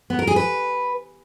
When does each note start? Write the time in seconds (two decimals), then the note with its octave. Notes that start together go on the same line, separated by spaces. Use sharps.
0.10 B3
0.19 A#4
0.27 G#4
0.36 B4